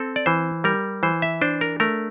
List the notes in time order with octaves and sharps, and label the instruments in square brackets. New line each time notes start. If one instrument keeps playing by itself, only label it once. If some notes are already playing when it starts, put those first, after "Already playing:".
Already playing: [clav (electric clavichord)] C4 A4
D5
E3 C5
G3 A#4
E3 C5
E5
D4 C5
A#4
A3 A#4